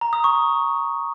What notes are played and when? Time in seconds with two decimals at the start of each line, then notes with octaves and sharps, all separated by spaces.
0.01 A#5
0.13 D#6
0.24 C#6